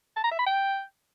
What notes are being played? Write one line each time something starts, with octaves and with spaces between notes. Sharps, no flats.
A5
A#5
E5
B5
G5